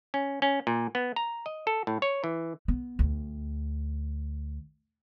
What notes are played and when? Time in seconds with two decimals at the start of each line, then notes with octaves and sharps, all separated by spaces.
0.14 C#4
0.42 C#4
0.67 A#2
0.95 B3
1.16 A#5
1.46 D#5
1.67 A4
1.87 A2
2.02 C#5
2.24 E3
2.68 B3
2.99 D2